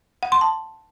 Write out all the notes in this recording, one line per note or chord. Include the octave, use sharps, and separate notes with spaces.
F#5
C6
A5